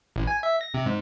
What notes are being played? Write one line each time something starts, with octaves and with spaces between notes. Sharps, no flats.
A1
G#5
E5
A#6
C3
G#2